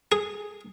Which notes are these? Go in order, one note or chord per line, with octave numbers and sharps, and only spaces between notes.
G#4